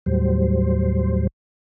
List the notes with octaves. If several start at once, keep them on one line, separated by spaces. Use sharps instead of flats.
D#2 A2 F#3 G3 C5